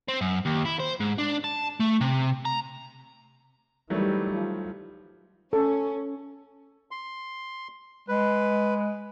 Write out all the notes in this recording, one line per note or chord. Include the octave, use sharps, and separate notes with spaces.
C4
F#2
D#2
E4
C5
G#2
D4
A5
A3
C3
A#5
D#3 E3 F#3 G3 A3
F3
C#4 A4
C6
G#3 B4